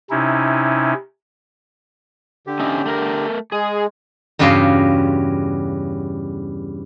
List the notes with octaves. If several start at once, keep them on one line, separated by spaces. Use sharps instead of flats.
C3 C#4 D#4 E4
D3 G4
C#4 D#4 E5
A3 A#4
G#3 G#4
E2 G2 C#3 F#4 F5 C6